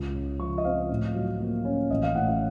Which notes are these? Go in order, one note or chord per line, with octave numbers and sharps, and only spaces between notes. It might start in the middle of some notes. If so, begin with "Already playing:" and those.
Already playing: C#2
C#3
F3 C#6
D#5
C4 F5
A2
F#3
A#3
C#4
A1 D#5
F5
A2 F#5
F5